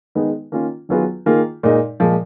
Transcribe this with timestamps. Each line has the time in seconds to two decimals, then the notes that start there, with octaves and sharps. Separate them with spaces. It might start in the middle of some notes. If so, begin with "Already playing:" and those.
0.15 D#3 G#3 B3 D#4 G#4
0.52 D#3 A#3 C#4 F4
0.89 D#3 F#3 B3 F4 G#4
1.26 D#3 A#3 F4 G#4
1.63 A#2 G#3 D#4
2.00 A#2 F3 G#3